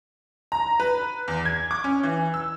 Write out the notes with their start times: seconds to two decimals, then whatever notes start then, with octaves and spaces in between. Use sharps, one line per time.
0.52 A#5
0.80 B4
1.28 E2
1.45 G#6
1.71 D6
1.84 C#4
2.03 E3
2.34 E6